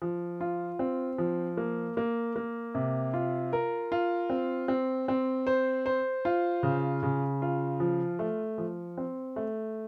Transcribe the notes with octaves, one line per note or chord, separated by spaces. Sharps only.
F3
F4
C4
F3
A#3
A#3
A#3
C3
F4
A#4
F4
C4
C4
C4
C5
C5
F4
C#3
C#3
F4
F3
A3
F3
C4
A3